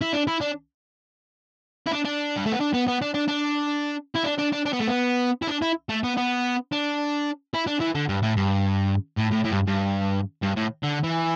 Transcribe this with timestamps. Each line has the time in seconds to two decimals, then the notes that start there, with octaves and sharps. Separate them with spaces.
0.01 E4
0.13 D4
0.27 E4
0.41 D4
1.87 E4
1.92 D4
2.05 D4
2.37 G3
2.46 A3
2.52 B3
2.60 D4
2.73 B3
2.88 B3
3.02 D4
3.14 D4
3.28 D4
4.15 E4
4.24 D4
4.39 D4
4.53 D4
4.66 D4
4.73 B3
4.80 A3
4.88 B3
5.42 E4
5.48 D4
5.62 E4
5.89 A3
6.04 B3
6.17 B3
6.72 D4
7.54 E4
7.67 D4
7.81 E3
7.95 D3
8.09 G2
8.23 A2
8.37 G2
9.18 A2
9.33 A2
9.45 A2
9.52 G2
9.67 G2
10.42 G2
10.56 A2
10.83 D3
11.03 E3